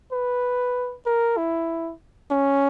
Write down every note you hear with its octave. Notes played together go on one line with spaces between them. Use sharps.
B4
A#4
E4
C#4